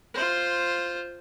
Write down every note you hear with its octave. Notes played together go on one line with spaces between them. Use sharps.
F4 C5